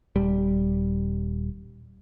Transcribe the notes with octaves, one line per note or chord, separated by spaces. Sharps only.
D#1 G3